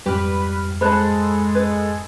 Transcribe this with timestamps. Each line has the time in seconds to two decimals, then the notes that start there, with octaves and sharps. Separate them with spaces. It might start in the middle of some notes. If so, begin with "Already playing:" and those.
0.06 F2 G#2 G3 G4 B4 F6
0.81 G#3 G#4 A4 C5 A5 B5 F#6
1.55 B4 G#6